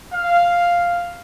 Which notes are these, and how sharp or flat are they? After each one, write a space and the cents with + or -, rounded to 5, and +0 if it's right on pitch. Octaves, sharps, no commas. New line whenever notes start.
F5 +0